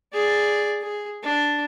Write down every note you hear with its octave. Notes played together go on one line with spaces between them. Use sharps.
G#4 D5
G#4
D4